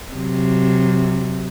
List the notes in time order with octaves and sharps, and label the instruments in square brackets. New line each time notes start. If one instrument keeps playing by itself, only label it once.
[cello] C3 F#3